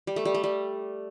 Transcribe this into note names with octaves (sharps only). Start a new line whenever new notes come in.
G3
A3
G3
A3
G3